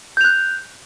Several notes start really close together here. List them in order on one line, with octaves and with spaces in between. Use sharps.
G6 F7 F#6